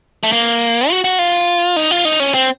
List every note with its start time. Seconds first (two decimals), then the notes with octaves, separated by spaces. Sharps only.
0.23 A3
0.32 A#3
0.90 F#4
1.04 F#4
1.19 F4
1.76 D#4
1.91 F4
2.05 D#4
2.20 C#4
2.34 C4